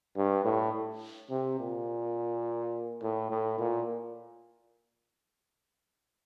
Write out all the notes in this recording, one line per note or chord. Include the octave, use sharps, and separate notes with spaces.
G2
A2
C3
A#2
A2
A2
A#2